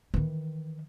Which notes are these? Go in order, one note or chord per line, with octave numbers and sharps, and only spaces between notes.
D#3 E3